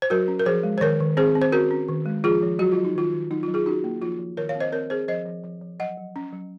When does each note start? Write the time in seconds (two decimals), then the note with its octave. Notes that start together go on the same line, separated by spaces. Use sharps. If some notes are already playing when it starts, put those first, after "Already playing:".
0.02 C5
0.10 F#3 F#4 A#4
0.28 C#4
0.39 A#4
0.46 F3 G#4 C5
0.63 G#3
0.78 C5
0.81 D#3 A#4 C#5
1.00 D#3
1.17 C4 G#4 C5
1.35 C4
1.42 C5
1.52 C#4 F#4 A#4
1.71 C#4
1.88 D#3
2.06 G#3
2.24 F3 F4 G#4
2.42 F3
2.59 F#3 F#4
2.72 F4
2.77 F#3
2.85 D#4
2.95 D#3 F4
3.13 D#3
3.31 F#3 D#4
3.43 F4
3.48 F#3
3.54 F4 G#4
3.66 C#4 D#4 F#4
3.84 A#3
4.02 F3 F4
4.19 F3
4.37 D#3 A#4 C#5
4.49 C#5 F5
4.55 C4
4.60 C5 D#5
4.72 C4 A#4 C#5
4.90 C4 G#4 C5
5.08 F3 C5 D#5
5.26 F3
5.44 F3
5.62 F3
5.80 F#3 D#5 F#5
5.97 F#3
6.16 C#4
6.33 F#3